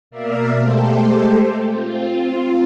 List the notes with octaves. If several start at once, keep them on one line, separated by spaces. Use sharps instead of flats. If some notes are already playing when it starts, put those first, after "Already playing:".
B2 A#3 A#4 D5 E5 F5
G#3 A3 G4 A4 C5
C4 F4